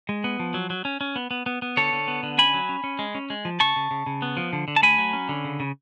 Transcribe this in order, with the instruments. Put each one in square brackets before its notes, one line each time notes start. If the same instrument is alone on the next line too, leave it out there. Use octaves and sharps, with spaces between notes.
[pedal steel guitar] G#3
B3
F3
F#3
F#3
C#4
C#4
B3
B3
B3
B3
D3 A4 C#5
D3
B3
D3
C#4 G#5 B5
F#3
C#4
C#4
G#3
C#4
G#3
F3
C#3 A5 C#6
C#3
C#3
C#3
B3
F3
D3
D3
A5
A3 G#5 B5
F#3
C#4
D3
C#3
C#3